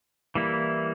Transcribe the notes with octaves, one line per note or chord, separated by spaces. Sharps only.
E3 G3 A#3 E4